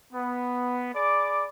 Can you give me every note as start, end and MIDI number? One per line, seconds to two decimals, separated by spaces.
0.13 0.89 59
0.95 1.48 68
0.95 1.48 74
0.95 1.48 83
0.95 1.48 86